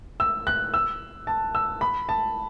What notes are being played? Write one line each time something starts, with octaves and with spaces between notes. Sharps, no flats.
E6
F#6
E6
A5
E6
B5
A5